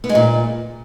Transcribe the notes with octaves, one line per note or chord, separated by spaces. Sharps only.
B3
G#3
A#2